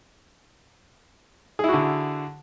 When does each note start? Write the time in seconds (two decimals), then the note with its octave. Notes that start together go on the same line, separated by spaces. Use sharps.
1.59 G#4
1.64 E4
1.69 F#4
1.73 D3